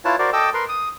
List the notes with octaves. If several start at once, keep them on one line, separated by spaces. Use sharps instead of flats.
E4 F4 B4 C#5 A5
F#4 A#4 C5 D5
A4 D#5 G5 D6 E6
A#4 B4 C6
D#6